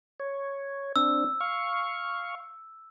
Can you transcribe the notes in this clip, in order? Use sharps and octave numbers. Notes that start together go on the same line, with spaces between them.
C#5
C4 D4 E6
F5 C#6